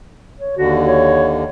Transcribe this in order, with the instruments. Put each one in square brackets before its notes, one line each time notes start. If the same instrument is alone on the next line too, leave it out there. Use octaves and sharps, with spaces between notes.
[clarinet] C#5
[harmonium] D#2 D3 [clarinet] F#4
[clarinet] C#5